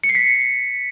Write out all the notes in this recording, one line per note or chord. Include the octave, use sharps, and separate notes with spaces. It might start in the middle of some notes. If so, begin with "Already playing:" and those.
C#7
C7
B6